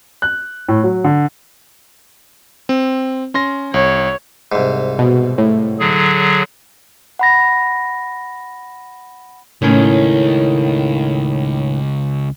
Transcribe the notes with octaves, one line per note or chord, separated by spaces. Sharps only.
F#6
A2
F#3
D3
C4
C#4 C6 A#6
C2 C#5
C2 G#2
B2
A2
D3 F#3 G#4
F#5 B5 A#6
C#2 A2 D#3 C#4